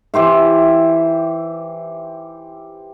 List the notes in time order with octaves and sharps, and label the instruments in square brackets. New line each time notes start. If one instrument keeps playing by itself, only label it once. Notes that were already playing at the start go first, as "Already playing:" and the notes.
[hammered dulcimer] E3 G4 C5 E5